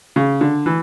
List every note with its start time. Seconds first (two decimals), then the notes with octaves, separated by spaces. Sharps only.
0.16 C#3
0.41 D3
0.66 E3